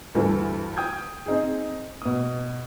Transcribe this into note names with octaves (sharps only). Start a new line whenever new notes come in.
D2 G2 E3 A4
G5 D#6 G6 G#6
C4 D#4 G#4
B2 D#6